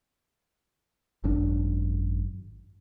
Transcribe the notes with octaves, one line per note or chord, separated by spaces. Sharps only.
G#1 F#2 D4